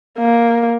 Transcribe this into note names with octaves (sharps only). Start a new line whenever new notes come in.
A#3